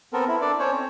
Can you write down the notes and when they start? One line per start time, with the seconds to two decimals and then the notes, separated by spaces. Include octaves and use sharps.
0.13 B3 C4 A4 A#4
0.28 E4
0.41 D4 A4 D5
0.59 C#4 C5 C#5
0.72 C4